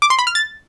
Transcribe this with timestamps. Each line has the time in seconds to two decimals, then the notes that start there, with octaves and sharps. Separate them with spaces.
0.02 D6
0.10 C6
0.19 B5
0.27 F6
0.35 A6